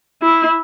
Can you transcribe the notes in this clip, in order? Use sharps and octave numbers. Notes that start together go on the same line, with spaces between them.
E4